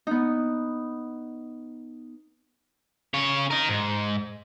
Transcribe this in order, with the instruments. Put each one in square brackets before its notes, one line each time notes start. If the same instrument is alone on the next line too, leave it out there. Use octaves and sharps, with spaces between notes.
[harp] B3 D#4
[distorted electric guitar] C#3 C#5
A#4 D#5
G#2